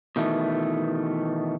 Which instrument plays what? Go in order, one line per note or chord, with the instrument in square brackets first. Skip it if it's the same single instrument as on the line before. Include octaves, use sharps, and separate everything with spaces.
[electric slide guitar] B2 D#3 E3 A3